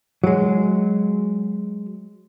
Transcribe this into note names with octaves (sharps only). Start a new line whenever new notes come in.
F#3 G#3